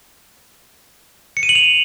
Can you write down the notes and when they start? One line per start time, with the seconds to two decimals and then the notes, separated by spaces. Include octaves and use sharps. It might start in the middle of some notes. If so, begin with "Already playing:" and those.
1.37 C#7
1.43 D#7
1.49 F#7
1.55 F7